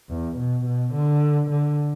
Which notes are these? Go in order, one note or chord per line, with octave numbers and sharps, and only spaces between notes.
E2
B2
B2
D3
D3